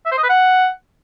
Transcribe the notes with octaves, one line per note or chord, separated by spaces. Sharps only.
E5
C5
D#5
B4
F#5